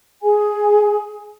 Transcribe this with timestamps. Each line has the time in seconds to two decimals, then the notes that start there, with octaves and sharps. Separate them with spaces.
0.22 G#4 G#5